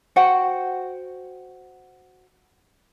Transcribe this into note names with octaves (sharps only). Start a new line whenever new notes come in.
F#4 C5 F#5 G5